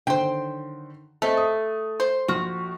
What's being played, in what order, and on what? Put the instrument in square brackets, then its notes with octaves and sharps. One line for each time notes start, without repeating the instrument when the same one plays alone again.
[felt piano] D3 D#3 [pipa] F#3 C5 [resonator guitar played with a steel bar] G5
[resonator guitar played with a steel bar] A3 [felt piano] C4 C5 D#5 [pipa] A4
[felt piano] D#6
[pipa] C5
[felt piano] A#1 F3 F6 [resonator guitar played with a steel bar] F#4